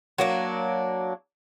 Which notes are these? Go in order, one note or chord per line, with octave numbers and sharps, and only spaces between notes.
F#3 A#3 D4